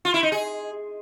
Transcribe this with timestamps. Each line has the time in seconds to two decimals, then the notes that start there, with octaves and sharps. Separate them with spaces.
0.05 F4
0.14 E4
0.23 D#4
0.32 G#4